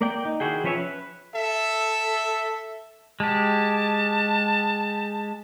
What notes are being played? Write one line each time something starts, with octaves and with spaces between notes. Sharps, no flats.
A#3 D5 G5
D#4
D#3 E4 F#4 G#4 G5
F3 C#4 B4 C#5 E5
B4
A4 E5
G#3 G4 A5